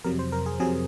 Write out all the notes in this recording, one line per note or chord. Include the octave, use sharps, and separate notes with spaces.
F2 C3 F#3 A#4
C5
A#4
G#4
F2 C3 F#3 G#4